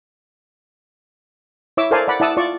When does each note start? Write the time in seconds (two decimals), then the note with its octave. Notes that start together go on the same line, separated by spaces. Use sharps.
1.77 E4 C#5 E5 D6 E6
1.91 A4 A#4 C5 D5 F5 G#5
2.08 D5 F#5 B5
2.20 E4 D5 F#5 A5 D#6 E6
2.37 F4 D5 C#6